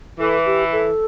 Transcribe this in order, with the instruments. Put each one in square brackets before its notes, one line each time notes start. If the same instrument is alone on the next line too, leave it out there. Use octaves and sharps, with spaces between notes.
[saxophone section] E3 [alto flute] A4
[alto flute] G4
A4